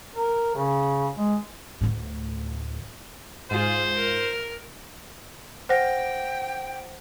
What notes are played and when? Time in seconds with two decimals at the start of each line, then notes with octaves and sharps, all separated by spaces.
0.16 A#4
0.55 C#3
1.17 G#3
1.81 D2 A2
3.51 G#2 F4 G#4 C5
3.95 A#4
5.69 C5 F#5 G5 A#6